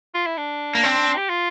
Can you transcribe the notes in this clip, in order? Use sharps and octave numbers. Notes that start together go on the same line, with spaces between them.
F4
E4
D4
A#3
C4
G4
F4